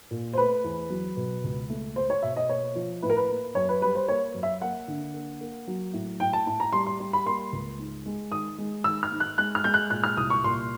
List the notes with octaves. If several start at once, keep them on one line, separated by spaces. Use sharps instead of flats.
A#2
C5
A3 B4
E2
F#3
B2
C#2
A3
A3 C5
C#5
B2 E5
D#5
A#3 C#5
F3
A2 B4
A#4
B4
A#3
F#2 C#5
B4
G3 B4
C5
A#3 C#5
F#2
E5
A#3 F#5
D3
A#3
A#3
F#3
A2
A2 G5
A5
A2 A5
A#5
G3 C6
C6
G3
B5
A#3 C6
C#2
G#2
G#3
D#3 D#6
G#3
D#3 E6
F6
G#2
F#6
G#3 F#6
F6
G#3 G6
F#6
A#2 F#6
F6
C2 D#6
C#6
A#2 C6